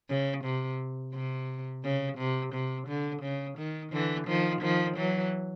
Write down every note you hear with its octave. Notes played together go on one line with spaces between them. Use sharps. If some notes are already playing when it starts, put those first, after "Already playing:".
C#3
C3
C3
C#3
C3
C3
D3
C#3
D#3
D3 E3
D#3 F3
D#3 F3
E3 F#3